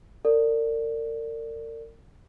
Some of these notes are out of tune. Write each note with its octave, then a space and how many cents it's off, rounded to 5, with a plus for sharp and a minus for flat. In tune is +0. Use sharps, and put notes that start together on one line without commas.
A#4 -35 D5 +0